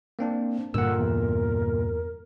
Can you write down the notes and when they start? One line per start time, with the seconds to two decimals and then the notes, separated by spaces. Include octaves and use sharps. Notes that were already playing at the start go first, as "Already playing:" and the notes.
0.19 A#3 C4 D4
0.74 G2 A#2 D3 A#4 F#5 E6
0.99 E2